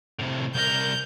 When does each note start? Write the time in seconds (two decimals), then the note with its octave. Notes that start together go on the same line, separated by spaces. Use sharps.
0.19 A2 C3
0.55 C2 A#4 G6